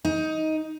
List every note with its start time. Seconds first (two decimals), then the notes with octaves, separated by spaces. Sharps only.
0.05 D#4